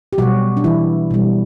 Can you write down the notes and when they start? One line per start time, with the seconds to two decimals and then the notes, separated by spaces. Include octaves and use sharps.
0.13 G4
0.18 B2 F#3 G3 F#4
0.57 D4
0.64 E3 E4
1.11 B2 G3